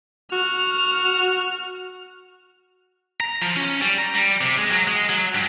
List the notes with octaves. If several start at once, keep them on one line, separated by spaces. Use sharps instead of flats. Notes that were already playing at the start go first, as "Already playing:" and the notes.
F#4 F6
A#5
F3
C#4
G3
A#5
G3
C3
G#3
F#3
G#3
F#3
G2